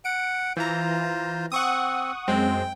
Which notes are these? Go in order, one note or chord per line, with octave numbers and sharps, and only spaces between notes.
F#5 D7
E3 F4 C5 A#5
C4 F#5 C#6 D#6
F#2 G#3 C4 G5